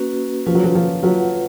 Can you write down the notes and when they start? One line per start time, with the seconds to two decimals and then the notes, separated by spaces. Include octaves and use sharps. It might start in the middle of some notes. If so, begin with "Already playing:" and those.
Already playing: A#3 C#4 F#4 B4
0.46 F3 C#4 F4 B4
0.55 F#3
0.64 F3
0.75 F3
1.03 F#3 F4 B4 F#5